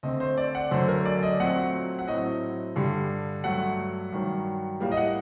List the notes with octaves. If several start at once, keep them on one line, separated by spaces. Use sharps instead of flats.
D3 A3 C4 D#5
C5
D5
F#5
F#2 D3 F#3 A3 C5
A#4
D5
D#5
A#2 F#3 A3 C4 F#5
F#5
A2 F#3 C4 D#5
G2 D3 G3
G2 F#3 A3 F#5
G2 D#3 F#3
A2 G3 A#3
D#5
F#5